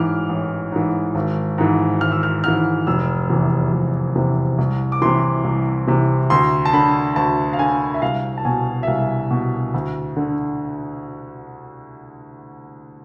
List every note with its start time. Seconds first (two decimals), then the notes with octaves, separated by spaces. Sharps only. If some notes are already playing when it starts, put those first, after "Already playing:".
Already playing: A1 G#2 E3 D6 F6
0.29 A1
0.72 G#2 E3
1.15 G#1
1.58 G#2 E3
2.01 G#1 F6
2.12 E6
2.23 F6
2.44 G#2 E3 F6
2.87 F1 E6
3.30 E2 C3 E3
3.73 F1
4.16 E2 C3 E3
4.58 C2
4.92 D6
5.02 C3 E3 C6
5.44 C2
5.87 C3 E3
6.30 D2 C6
6.65 A5
6.73 D3 B5
7.16 D2 A5
7.53 F5
7.59 D3 G#5
7.94 E5
8.02 C2 F5
8.38 A5
8.45 B2 G#5
8.83 E5
8.88 C2 F5
9.31 B2
9.74 D2
10.17 D3